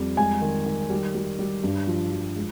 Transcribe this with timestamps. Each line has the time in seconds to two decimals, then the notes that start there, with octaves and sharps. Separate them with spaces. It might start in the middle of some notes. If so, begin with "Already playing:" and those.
Already playing: F2 G3
0.17 G#3 G#5
0.41 D#3
0.66 D#3
0.90 G3
1.15 G3
1.39 G3
1.64 G2
1.87 F3
2.12 F3
2.36 G#3